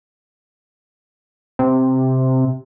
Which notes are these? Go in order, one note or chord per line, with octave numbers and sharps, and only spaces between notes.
C3